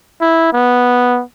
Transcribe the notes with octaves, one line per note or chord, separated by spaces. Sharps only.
E4
B3